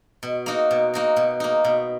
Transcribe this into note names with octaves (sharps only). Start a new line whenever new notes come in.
B2
A#3 D#4 F#4
B2
A#3 D#4 F#4
B2
A#3 D#4
B2